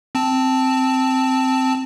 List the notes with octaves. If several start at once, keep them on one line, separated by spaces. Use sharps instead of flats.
C4 A5